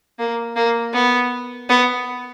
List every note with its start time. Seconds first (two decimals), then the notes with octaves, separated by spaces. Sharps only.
0.19 A#3
0.56 A#3
0.94 B3
1.69 B3